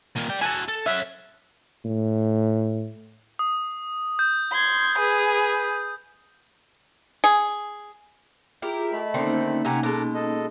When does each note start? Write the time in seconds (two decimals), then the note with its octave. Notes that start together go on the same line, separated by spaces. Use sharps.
0.16 A#2 D#3
0.30 D5 G5
0.42 E4 F#4 G#5 A5
0.69 A4
0.86 C#4 E5 F#5
1.85 A2
3.39 D#6
4.19 G6
4.53 C6 G#6
4.98 G#4 B4
7.24 G#4
8.62 E4 F4 G4 G#4 A#4
8.93 A3 D#5 B5
9.14 D3 D#3 A#3 C4 C#4 D#4
9.65 C3 A3 G4 F#5 G#5 A#5
9.83 B2 G#3 A4 A#5 D6
10.14 A4 D#5